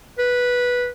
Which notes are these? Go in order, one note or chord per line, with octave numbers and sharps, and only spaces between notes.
B4